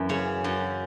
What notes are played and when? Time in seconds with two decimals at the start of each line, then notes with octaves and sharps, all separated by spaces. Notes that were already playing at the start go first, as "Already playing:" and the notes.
Already playing: F#2 E3
0.09 C#3 C#5
0.44 F#2